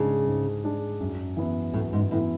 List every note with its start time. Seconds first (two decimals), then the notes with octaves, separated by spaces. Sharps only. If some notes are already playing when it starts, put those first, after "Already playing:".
Already playing: G#2 C#3 G#3 D4
0.27 G#2
0.64 G#3 D4
1.00 F#2
1.37 E3 B3 E4
1.73 F#2 A2
1.93 G#2
2.11 A2 E3 B3 E4